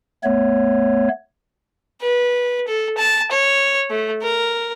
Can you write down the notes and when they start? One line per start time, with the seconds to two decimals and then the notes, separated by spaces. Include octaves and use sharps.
0.24 A3 B3 C#5
2.02 B4
2.68 A4
2.97 A5
3.31 C#5
3.90 A3
4.22 A#4